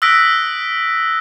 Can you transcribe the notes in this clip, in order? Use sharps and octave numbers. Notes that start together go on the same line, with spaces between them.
D#6 E6 F#6 A#6 B6 D7